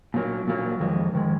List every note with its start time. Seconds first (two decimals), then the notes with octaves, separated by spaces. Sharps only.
0.14 A#2 F#3 A#3
0.48 A#2 F#3 A#3
0.80 F2 D#3 G#3
1.13 F2 D#3 G#3